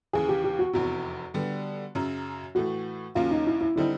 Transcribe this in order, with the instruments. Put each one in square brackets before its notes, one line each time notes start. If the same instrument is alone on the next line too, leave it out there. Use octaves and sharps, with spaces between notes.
[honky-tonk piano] D#2 C#3 E3 [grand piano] G#4
[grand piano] G4
G4
F#4
[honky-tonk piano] F1 E2 C3 [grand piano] F#4
[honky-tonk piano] D3 G3 B3
F#2 C#3 F#3
[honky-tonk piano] A2 E3 A3 [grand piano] F#4
[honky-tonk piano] D#2 C#3 F#3 A#3 C#4 [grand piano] F4
[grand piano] D#4
E4
E4
[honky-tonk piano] D3 G3 C4 D#4 [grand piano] E4